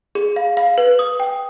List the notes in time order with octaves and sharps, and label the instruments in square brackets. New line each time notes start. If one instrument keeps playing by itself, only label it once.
[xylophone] G#4
F5
F5
B4
D#6
G5